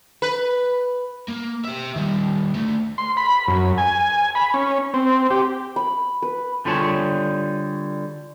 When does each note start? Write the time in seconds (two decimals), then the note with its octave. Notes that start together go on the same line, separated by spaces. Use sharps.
0.22 B4
1.28 A#3
1.65 G4 E5
1.96 D#3 G3
2.54 D2 A3
2.98 C6
3.17 B5
3.48 F#2
3.78 G#5
4.35 B5
4.54 C#4
4.94 C4
5.31 G4
5.76 B5
6.22 B4
6.65 D3 G3 F4 G#4 C#5 A5